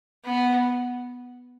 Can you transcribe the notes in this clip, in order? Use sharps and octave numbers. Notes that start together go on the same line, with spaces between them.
B3